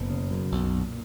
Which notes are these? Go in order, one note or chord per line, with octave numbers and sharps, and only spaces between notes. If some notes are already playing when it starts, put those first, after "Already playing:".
Already playing: F#1 B2 B3
C#3
F#2
B1
A#2